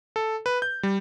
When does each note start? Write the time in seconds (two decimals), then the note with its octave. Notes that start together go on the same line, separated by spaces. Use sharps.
0.16 A4
0.46 B4
0.62 G6
0.83 G3